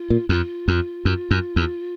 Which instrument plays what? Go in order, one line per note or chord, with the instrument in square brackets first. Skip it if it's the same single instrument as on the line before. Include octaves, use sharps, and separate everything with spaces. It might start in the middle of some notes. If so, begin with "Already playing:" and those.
Already playing: [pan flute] F4
[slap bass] A#2
[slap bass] F2 [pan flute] F4
[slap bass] F2
F#2
F#2
E2